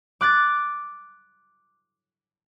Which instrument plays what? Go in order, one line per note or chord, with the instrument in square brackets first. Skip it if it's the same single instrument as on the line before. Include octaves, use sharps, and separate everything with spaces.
[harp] D6 F#6 A6